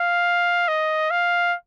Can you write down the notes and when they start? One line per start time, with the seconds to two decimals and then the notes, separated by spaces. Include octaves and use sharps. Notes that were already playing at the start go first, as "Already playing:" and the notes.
Already playing: F5
0.68 D#5
1.11 F5